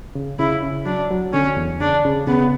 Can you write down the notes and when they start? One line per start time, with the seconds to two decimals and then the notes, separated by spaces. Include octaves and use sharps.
0.15 C#3
0.39 C#3 E4
0.63 C#4
0.86 F#3 D4
1.11 F#3
1.33 D3 C#4
1.57 E2
1.81 C#3 D4
2.05 C#3
2.27 C#3 B3